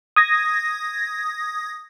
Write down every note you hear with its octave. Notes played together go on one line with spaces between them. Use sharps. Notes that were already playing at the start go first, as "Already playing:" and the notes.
D#6 G#6 A#6